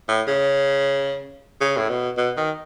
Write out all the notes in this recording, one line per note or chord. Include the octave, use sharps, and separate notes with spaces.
A2
C#3
C#3
A2
B2
B2
D#3